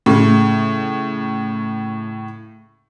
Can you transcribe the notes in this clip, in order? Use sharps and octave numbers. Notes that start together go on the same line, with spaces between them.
A2 C#3